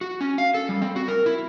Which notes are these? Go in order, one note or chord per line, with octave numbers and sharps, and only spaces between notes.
F#4
C#4
F5
A4
G3
C4
F#4
A#4
E4